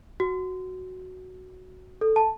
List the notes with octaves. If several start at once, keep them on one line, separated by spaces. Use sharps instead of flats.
F#4
A4
A5